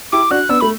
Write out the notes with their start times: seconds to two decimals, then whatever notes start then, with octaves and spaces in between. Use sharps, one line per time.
0.12 E4 G4 D6
0.30 D4 F#4 F#6
0.49 B3 D4 E6
0.61 A3 B5